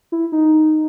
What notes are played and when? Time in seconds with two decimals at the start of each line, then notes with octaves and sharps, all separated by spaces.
0.12 E4
0.32 D#4